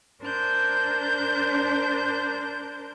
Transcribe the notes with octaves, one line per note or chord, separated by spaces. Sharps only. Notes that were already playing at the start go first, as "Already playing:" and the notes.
D4 A#4 C5 G6